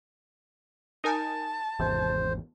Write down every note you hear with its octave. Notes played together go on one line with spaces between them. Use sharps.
D#4 A#4 G#5 A5
G#1 E2 C3 C5